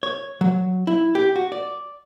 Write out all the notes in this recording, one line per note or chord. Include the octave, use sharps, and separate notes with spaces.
C#5
F#3
E4
G4
F#4
D5